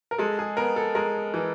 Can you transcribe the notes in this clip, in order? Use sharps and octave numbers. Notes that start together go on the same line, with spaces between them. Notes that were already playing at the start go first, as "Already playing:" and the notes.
A#4
G#3 A4
G#4
B3 A#4
A4
G#3 A#4
E3